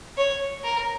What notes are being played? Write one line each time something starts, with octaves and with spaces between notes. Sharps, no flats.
C#5
A#4